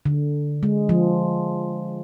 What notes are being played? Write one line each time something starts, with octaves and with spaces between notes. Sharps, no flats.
D3
G#3
F3